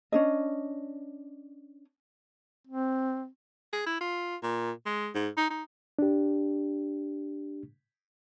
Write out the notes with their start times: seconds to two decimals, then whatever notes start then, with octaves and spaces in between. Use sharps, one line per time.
0.12 C#4 D4 D#5
2.67 C4
3.73 G#4
3.86 E4
4.01 F4
4.43 A#2
4.86 G#3
5.15 G#2
5.37 D#4
5.50 D#4
5.99 D4 G4